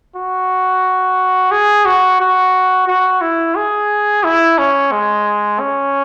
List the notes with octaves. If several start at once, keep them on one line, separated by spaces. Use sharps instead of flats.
F#4
G#4
F#4
F#4
F#4
E4
G#4
E4
C#4
G#3
C#4